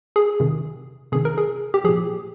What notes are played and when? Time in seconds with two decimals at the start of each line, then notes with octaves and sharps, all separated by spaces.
0.16 G#4
0.40 C3 D#3
1.12 C3 D#3 G#4
1.25 A#4
1.38 G#4
1.74 G4
1.84 A#2 F3 G#4